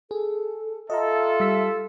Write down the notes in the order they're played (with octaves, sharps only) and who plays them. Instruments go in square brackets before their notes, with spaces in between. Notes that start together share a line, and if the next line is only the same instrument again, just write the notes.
[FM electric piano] G#4 [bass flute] A4
[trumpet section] F4 A4 [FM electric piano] D#5 A#5 [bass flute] E5
[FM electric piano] G3 E6 B6